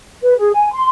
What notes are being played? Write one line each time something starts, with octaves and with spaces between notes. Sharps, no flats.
B4
G#4
G#5
C6